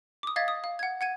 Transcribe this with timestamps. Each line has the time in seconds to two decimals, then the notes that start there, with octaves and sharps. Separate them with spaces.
0.23 D6 D#6
0.36 D#5 F5 G#6 A6 B6
0.48 D#6
0.64 F5
0.79 F#5 G#6
1.01 F#5 G#6 D#7